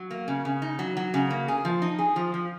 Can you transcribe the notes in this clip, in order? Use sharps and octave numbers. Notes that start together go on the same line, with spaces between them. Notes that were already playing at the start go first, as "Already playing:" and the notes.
Already playing: F#3
A#3
C#3
C#3
D#4
F#3
F#3
C#3
A#3
G#4
F3
D#4
G#4
F3
F3